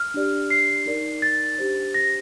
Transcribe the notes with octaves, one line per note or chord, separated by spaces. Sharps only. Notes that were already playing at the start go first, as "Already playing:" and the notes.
Already playing: F6
D4 G4 D5
C7
D#4 A#4 D5
A6
D4 G4 C5
A#6